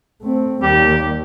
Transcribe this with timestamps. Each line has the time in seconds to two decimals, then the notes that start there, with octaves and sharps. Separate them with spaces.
0.22 A3 C4
0.63 D#2 G3 G4